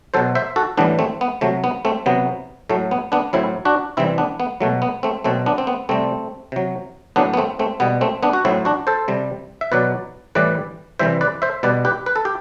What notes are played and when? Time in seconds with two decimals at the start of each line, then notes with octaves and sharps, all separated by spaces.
0.14 B2 F#3 A4 C5
0.35 C5 E5
0.56 F#4 A4
0.77 A2 E3 G3 B3 D4
0.99 A3 C4
1.21 B3
1.41 C3 F#3 A3
1.64 B3
1.85 A3 C4
2.06 C3 F#3 B3
2.69 A2 F#3 A3
2.91 B3
3.12 B3 D4
3.33 A2 F#3 C4 E4
3.65 D4 F#4
3.97 C3 E3 G3 C4 E4
4.18 B3 D4
4.40 B3
4.61 B2 F#3 A3
4.82 B3
5.03 A3 C4
5.24 B2 F#3 A3 C4
5.46 B3 D4
5.58 C4
5.67 B3
5.89 C3 G3 A3 C4
6.52 C3 F#3
7.16 A2 F#3 B3 D4
7.34 B3
7.37 A3 C4
7.59 A3 C4
7.80 B2 G3 B3
8.01 A3 C4
8.23 B3 D4
8.33 F#4
8.45 A2 F#3 C4 E4
8.65 D4 F#4
8.87 A4 C5
9.08 C3 G3
9.61 E5
9.72 B2 F#3 B4 D5
10.35 A2 E3 G3 B4 D5
10.99 C3 E3 G3 C5 E5
11.21 B4 D5
11.42 C5 E5
11.63 B2 G3 B4 D5
11.85 G4 B4
12.06 B4
12.16 A4
12.25 G4